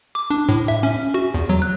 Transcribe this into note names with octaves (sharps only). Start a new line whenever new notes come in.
D6
D4
A2
E5
C#4
F#4
E2
F#3
F#6